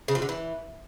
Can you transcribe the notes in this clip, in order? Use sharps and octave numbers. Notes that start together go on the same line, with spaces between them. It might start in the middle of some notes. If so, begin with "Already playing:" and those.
C#3
F3
D3
E3